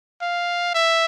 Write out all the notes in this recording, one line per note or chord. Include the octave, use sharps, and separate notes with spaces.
F5
E5